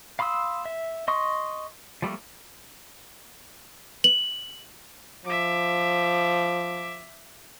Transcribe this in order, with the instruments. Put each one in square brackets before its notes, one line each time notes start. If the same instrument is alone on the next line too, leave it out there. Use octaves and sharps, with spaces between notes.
[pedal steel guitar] F5 B5 C6 D#6 E6
E5
D#5 C6 C#6 D#6
F3 G3 A3 A#3
[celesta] F#7
[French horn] F3 [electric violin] E5 D6